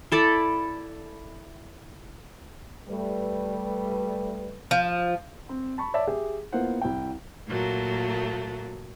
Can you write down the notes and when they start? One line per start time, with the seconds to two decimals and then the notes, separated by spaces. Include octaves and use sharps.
0.12 E4 A4 D5
2.89 G3 A3 B4
4.71 F3
5.49 C4
5.78 A5 B5 C#6
5.94 C#5 D5 E5 A5
6.07 G4 G#4 E5
6.53 A#3 B3 E4 F4 C5 F#5
6.81 C2 E4 G5
7.48 A#2 F#3 A3 A#3